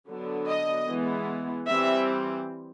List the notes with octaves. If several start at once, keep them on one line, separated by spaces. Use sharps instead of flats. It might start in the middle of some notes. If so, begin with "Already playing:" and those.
D3 F#3 B3 D4
D#5
E3 G#3 B3
E3 G3 C4 E5